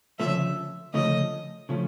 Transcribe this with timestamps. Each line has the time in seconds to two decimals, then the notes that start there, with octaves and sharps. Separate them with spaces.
0.19 D2 C#3 F3 A3 C#4 E5
0.94 D2 C#3 F3 A3 C#4 D#5
1.69 C#3 F3 A3 C#4